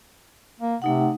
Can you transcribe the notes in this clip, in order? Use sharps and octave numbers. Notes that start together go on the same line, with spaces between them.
A#3
C3 A3 D#4 F#5